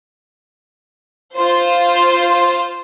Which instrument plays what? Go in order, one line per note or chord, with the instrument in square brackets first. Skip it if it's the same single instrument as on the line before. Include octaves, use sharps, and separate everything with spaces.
[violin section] F4 C5